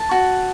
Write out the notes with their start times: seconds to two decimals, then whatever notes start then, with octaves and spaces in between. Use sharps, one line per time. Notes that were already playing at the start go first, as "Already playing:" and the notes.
Already playing: A5
0.11 F#4